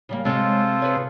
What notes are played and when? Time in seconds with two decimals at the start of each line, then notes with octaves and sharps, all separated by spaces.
0.09 C#3 G3 A#3
0.25 C3 G#3 C4 F4 A4 C#5
0.82 G#4 B4 C#5